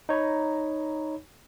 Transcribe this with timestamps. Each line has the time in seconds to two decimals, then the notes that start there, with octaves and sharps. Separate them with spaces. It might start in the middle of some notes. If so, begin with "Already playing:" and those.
0.09 D#4 C#5 A#5 B5